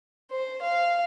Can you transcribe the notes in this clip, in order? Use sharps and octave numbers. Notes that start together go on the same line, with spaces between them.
C5
F5